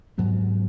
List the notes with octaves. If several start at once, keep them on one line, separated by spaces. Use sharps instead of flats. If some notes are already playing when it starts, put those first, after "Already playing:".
G#2 F#3 B3